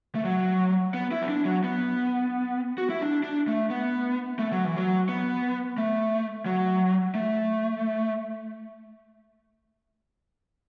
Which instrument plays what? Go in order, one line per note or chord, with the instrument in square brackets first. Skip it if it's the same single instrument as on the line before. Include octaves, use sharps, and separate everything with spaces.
[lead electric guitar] A3
F#3
B3
E4
B3
D4
F#3
B3
F#4
E4
D4
D4
A3
B3
A3
F#3
E3
F#3
B3
A3
F#3
A3